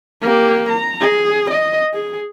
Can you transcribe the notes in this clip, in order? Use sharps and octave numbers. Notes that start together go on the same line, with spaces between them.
A#3 G4
A#5
G#4
D#5
G#4